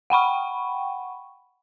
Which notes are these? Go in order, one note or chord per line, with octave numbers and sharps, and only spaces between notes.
F#5 G5 B5 C#6